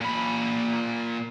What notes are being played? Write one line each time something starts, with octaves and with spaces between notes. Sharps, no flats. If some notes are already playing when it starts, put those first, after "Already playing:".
A#2 B5